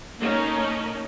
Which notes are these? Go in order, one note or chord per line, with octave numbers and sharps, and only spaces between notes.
A#3 C#4 D#4 A4 A#4